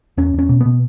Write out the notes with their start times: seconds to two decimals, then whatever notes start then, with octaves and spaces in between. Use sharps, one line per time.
0.17 E2 C#4
0.34 E2 C#4
0.49 B2
0.61 B2 B3